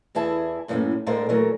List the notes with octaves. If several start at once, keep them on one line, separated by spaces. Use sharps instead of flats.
E2 E3 E4 G#4 A5
F#2 A2 E3 G#3 A#3 C#4
D2 A2 D3 G#3 A#4 C5
A#2 E3 F#3 A3 A#4